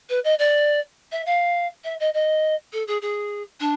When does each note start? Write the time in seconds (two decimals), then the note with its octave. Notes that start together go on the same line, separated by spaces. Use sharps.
0.09 B4
0.24 D#5
0.38 D5
1.11 E5
1.26 F5
1.84 E5
2.00 D#5
2.13 D#5
2.72 A4
2.87 G#4
3.01 G#4
3.60 D4